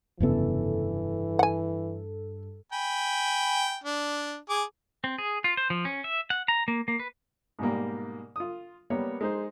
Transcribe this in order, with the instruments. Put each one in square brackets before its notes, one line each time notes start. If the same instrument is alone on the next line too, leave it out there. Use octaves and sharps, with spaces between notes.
[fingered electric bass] F1 C#3 B3 [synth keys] G2 A4 [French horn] E3
[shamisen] F#5 G#5
[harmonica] G5 G#5 B5
D4
G#4 D6
[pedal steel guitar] C4
G#4
F4
C5
F3
C#4
E5
F#5
A#5
A#3
A#3
B4
[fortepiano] G#2 B2 G3 A#3
F4 D#6
G3 A#3 B3 C#5
G#3 D#4 C5